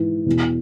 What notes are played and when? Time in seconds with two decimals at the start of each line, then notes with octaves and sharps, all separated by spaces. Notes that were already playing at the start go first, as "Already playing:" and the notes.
Already playing: G#2 E3
0.26 E2 B2